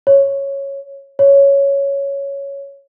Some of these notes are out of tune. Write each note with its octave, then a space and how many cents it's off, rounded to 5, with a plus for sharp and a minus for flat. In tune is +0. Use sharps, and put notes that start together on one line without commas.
C#5 -5
C#5 +5